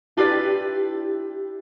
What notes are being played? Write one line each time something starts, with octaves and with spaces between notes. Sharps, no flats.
D4 E4 F4 G4 B4 D5